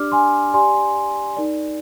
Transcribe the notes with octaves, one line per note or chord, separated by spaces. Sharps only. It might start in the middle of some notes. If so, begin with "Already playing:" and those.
Already playing: D4 G4 D5 D6 F6
G#5 C6
G4 D5 G#5 C6
D#4 A#4 D5